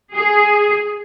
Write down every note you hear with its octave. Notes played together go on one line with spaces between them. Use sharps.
G#4